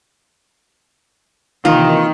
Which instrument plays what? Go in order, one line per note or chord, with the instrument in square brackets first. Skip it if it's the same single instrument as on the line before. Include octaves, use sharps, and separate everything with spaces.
[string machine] C3 E3 A#3 [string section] D#3 [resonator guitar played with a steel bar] F4